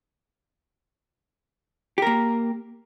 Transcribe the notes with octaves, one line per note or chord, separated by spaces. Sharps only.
A#3 G4 A#4